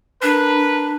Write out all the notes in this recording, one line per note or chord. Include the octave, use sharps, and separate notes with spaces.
D4 A#4 B4